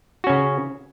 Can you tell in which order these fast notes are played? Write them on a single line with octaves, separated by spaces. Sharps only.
F#4 C#4 C#3